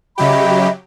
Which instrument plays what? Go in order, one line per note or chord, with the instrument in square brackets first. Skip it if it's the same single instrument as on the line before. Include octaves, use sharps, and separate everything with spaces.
[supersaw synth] C#3 F#3 G4 [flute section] D#5 E5 B5